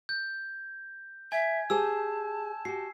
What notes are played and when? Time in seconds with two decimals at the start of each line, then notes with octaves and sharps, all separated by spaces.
0.09 G6
1.32 E5 G#5 G#6
1.70 G4 G#4 C5 A5 E6
2.65 F#4 G4 C7